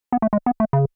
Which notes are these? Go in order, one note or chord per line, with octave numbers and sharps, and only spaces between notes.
B3
A3
G#3
B3
A3
C#3